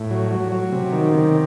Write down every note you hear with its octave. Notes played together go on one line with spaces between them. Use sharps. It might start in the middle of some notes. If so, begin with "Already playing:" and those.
Already playing: A2
F#3
F#3
F#3
C3
D#3
C3